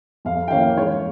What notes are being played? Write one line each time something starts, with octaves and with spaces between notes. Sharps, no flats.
F2 F5
G5
E3 A#3 C#4 F5
G#2 C#5